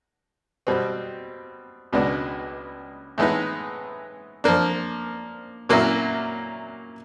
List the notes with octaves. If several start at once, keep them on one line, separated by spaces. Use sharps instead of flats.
B2 G3 C4
C#2 B2 G#3 B3 D4
A2 E3 G#3 B3 D#4
F3 A#3 D4
A#2 F#3 A#3 C#4 E4